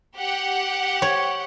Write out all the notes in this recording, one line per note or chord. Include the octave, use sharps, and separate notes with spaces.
G4 F#5
C#5